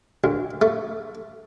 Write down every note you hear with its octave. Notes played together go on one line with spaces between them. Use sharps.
D2
A3